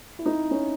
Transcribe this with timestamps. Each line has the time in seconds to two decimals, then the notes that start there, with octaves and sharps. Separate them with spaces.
0.19 E4
0.26 D#4
0.51 C#4